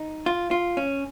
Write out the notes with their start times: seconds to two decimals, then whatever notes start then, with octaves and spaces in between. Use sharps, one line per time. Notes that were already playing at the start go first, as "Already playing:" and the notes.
Already playing: D#4
0.26 F4
0.51 F4
0.77 C#4